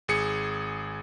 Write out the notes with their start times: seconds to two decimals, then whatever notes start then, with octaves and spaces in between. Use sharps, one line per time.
0.08 G#1 G#4 C#7